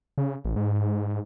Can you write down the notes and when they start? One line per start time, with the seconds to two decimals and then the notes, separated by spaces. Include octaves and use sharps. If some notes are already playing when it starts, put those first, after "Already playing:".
0.18 C#3
0.45 A1
0.56 G#2